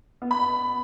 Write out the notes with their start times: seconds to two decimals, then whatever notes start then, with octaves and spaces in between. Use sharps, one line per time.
0.22 B3
0.31 B5